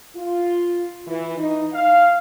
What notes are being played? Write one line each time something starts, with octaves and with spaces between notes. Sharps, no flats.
F4
E3
D#4
F5